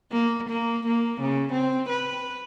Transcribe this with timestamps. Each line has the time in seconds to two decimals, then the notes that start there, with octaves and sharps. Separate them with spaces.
0.12 A#3
0.49 A#3
0.87 A#3
1.21 C#3
1.53 C4
1.89 B4